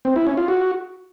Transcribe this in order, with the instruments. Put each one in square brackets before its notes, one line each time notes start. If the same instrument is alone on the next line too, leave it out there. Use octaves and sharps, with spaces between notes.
[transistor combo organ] C4
E4
C#4
F4
F#4